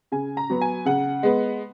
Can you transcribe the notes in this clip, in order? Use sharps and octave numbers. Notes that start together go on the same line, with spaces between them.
C#3 G#5
A#5
F#3 B3
G#5
C#3 F#5
G#3 B3